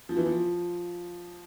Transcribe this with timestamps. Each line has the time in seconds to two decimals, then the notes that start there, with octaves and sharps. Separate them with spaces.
0.09 F3
0.17 E3
0.26 F3